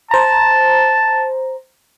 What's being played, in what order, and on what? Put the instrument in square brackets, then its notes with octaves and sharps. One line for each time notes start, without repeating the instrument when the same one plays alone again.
[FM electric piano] C5 A#5 [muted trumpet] A5